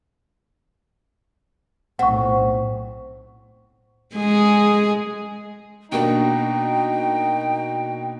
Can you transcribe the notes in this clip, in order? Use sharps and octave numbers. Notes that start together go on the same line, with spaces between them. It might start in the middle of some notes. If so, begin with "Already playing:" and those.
B1 A2 C4 F#5 C#6
G#3 G#4
B2 A#3 D4 D#4 G5